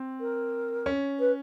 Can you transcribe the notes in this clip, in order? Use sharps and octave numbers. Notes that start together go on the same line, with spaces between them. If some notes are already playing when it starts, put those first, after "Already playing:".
Already playing: C4
A#4
C#4
B4